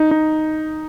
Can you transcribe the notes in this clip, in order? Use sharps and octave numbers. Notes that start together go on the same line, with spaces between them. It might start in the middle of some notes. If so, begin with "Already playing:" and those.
Already playing: D#4
D#4